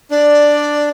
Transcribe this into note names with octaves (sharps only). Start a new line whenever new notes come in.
D4 D5